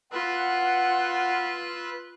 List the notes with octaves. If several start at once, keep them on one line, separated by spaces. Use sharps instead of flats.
F4 B4 F#5 E6 F#6